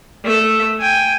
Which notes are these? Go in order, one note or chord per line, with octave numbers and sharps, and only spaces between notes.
A3 E5
G5 G#5